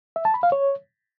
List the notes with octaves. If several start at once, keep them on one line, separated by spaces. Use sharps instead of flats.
E5
A5
B5
F5
C#5